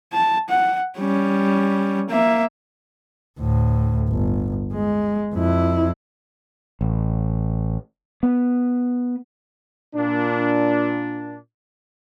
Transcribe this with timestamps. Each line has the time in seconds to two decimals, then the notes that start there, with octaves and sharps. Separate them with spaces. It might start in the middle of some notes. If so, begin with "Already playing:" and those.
0.13 A5
0.49 F#5
0.98 G3 C#4
2.09 A#3 E5
3.40 D2 A2
4.09 G1
4.74 G#3
5.35 F2 E4
6.81 A1
8.23 B3
9.94 A#2 D4